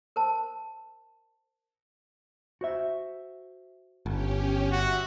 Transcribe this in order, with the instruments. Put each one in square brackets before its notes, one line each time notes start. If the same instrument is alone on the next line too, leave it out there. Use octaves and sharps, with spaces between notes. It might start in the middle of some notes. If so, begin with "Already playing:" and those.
[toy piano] A#4 C5 A5
[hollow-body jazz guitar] F#4 C5 E5
[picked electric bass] G1 [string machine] C#4 G4
[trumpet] F#4 [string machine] E5